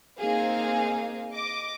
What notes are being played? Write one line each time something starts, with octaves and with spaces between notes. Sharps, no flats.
A#3 C4 D#4 G#4 F5
D#5 D6